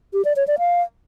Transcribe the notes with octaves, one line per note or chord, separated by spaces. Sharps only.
G4
D5
C#5
D5
F5